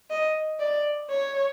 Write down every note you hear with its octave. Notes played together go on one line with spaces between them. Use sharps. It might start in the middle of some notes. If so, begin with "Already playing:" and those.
D#5
D5
C#5